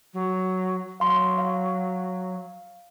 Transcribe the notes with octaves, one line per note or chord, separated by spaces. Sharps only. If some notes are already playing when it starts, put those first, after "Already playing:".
F#3
F#3 F5 C6
F5